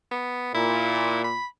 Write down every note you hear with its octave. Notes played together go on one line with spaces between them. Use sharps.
B3
A#2 E4
B5